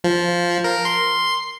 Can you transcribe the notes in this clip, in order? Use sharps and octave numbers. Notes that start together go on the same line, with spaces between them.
F3
A#4
C6